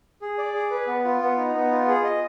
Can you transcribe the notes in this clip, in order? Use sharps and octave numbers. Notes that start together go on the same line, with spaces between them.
G#4
D5
G#4
B4
B3
F4
B3
D#4
B3
F4
G#4
D#5